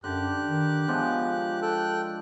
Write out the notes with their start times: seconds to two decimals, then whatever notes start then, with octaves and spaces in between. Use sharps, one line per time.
0.04 F#2 D3 G4 F#6
0.44 D#3
0.88 F3 G#3 B3 D4
1.62 A4 G5 F#6